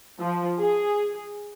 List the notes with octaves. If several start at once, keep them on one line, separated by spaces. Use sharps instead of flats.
F3
G#4